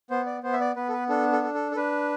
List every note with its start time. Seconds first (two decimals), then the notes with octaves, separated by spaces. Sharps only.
0.10 B3 C5
0.26 D5
0.43 B3 C5
0.53 E5
0.60 D5
0.76 B3 B4
0.89 A4
0.92 B4
1.09 D4 A4
1.32 A4
1.44 A4
1.54 A4
1.71 A4
1.76 D4 B4